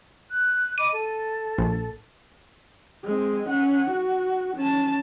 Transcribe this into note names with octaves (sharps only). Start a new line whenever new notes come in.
F#6
D#5 B5 D6 D#7
A4
A#1
G#3 C4
C#4 F#5
F#4
C#4 A5